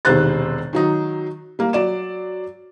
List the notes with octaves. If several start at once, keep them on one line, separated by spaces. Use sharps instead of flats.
E1 C3 D#3 C5 F#6 A6
D#3 F#3 D#4
G3 A#3
F#3 D5 E7